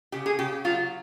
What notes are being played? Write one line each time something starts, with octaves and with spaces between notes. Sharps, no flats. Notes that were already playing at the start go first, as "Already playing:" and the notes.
C#3 G4
G#4
C#3 G4
F#3 F4